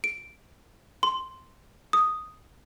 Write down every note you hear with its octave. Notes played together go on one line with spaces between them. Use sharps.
D7
C6
D#6